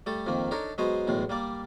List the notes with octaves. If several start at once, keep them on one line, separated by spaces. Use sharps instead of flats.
G3 A3 A4
F2 D#3 A#3
D4 D#4 A4 A#4 C#5
F#3 G#3 B3 C5 C#5 D#5
B1 E2 A2 G#3
G3 A#3 D5